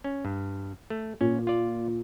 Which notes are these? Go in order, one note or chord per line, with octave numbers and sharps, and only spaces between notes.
C#4
G2
A3
A#2 C#4
F4 D5